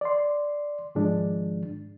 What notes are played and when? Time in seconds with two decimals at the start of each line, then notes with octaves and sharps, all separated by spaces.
0.01 D5 C6
0.95 G#2 D#3 F3 G#3 D4